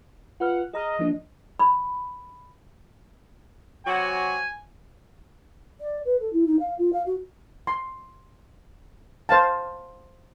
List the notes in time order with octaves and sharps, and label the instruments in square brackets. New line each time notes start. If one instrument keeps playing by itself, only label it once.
[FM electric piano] F4 B4 F6 [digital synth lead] F#5
[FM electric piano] G#4 A#5 F6 [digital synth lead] D#5
[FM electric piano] F3 A#3 D4
[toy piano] B5
[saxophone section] C3 F#3 F#4 [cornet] G#5
[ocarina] D5
B4
A4
E4
D#4
F5
F4
F5
F#4
[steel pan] C6
C5 F5 A5